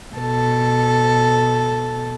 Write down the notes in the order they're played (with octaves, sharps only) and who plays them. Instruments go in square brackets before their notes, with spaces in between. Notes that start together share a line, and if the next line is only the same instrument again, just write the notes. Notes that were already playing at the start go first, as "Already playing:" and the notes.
[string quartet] B2 A4